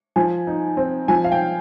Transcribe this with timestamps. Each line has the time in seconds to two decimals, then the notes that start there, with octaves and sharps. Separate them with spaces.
0.16 F3 G#5
0.47 D#4
0.77 C4
1.08 F3 G#5
1.24 F5
1.32 G5